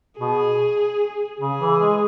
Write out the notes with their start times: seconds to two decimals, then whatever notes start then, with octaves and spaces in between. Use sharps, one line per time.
0.19 B2 G#4
1.40 C#3 G#4
1.61 E3
1.81 G#3